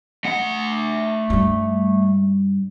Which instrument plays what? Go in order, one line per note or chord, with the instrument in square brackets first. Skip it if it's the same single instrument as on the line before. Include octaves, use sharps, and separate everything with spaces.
[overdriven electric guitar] A3 F#5
[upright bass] G2 G3